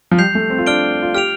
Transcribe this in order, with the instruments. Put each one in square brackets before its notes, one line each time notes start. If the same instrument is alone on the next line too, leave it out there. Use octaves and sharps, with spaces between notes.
[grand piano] F3
[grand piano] G3 [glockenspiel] G6 C7 F7
[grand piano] A3
C4
F4
[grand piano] D4 [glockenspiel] F6 D7 G7
[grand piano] F4
[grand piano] G4 [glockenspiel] F6 D7 F7